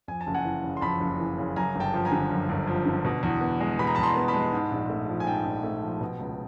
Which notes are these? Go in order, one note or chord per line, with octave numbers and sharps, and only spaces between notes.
F2 G#5
A5
F#1
F#5 G#5
E3
C#3
C6
F2 A5 B5
F#1
E3
C#3
F#2 G#5 A#5
G1
G5 A5
F3
G#5 A#5
D3
F#2
G1
F3
D3
B2
E2
B3
G#3
B2 B5
A#5
E2 A5 B5
A#5 C6
B3
A5 B5
G#3
G#2
A#1
A3
F3
G#5
G#2 G5 A5
A#1
A3
F3
B2
C#2